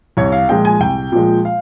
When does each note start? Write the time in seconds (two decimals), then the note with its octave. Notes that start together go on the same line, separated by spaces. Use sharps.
0.17 C2 C#5
0.32 F5
0.49 A#2 F3 G#3 G5
0.65 G#5
0.80 C2 G5
1.12 A#2 F3 G#3
1.45 F5